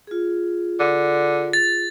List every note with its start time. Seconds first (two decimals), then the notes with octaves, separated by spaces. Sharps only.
0.07 F4 G#4
0.80 D3
1.53 A6